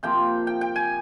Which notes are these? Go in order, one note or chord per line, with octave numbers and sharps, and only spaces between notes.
C3 F3 A#3 G5
G5
G5
G#5